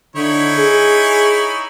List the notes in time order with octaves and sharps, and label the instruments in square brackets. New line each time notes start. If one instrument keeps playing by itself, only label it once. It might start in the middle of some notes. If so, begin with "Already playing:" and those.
[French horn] D3 [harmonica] D#4 E4 C#5
[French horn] G#4